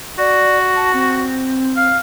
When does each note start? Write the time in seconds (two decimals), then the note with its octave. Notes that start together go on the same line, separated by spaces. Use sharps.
0.19 F#4 D5
0.75 A5
0.94 C4
1.76 F5